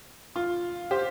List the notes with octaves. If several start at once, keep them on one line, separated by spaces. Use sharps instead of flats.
F4
G4 C5